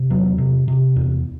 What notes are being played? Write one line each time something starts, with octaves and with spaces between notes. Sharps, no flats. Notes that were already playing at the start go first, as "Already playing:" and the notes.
Already playing: C3
E2 F#3
C3
C3
E2